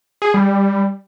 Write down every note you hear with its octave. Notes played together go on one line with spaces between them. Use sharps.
G#4
G3